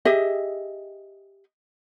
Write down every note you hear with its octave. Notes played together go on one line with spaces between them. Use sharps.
G4 G#4 D#5 E5